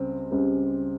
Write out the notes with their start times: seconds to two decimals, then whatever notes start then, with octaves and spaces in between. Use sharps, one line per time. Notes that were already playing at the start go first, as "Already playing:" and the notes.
Already playing: C#2 C#3 G3 C4
0.32 C#2 C#3 G3 C4